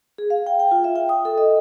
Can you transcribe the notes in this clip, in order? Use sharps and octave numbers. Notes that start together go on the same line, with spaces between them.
G#4
F5
G5
G5
F4
E5
G5
D#6
A4
D#5